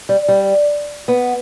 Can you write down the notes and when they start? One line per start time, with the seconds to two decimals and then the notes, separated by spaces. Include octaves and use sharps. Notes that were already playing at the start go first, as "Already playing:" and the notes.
0.09 G3
0.28 G3
1.08 B3